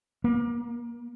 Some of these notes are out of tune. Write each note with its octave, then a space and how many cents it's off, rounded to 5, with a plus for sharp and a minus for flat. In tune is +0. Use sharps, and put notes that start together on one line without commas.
A#3 +30